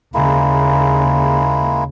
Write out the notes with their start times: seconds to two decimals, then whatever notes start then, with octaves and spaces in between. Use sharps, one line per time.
0.14 D#2 C#3 G#3 A#3 E4